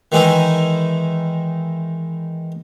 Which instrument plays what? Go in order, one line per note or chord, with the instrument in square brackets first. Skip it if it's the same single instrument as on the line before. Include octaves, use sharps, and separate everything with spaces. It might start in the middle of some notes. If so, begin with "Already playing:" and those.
[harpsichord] D#3 E3 G#3 D#4 E4